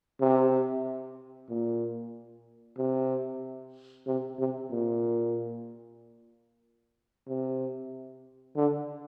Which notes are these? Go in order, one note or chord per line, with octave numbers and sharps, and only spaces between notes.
C3
A#2
C3
C3
C3
A#2
C3
D3